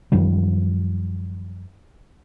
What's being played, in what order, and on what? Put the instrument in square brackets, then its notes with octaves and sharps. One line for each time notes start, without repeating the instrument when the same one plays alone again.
[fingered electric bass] F#2 D#3 F3 G3